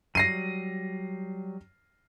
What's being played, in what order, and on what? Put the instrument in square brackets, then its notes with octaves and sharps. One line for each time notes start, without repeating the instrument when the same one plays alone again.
[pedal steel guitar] F#3 G3 [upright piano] A#6 C7 D#7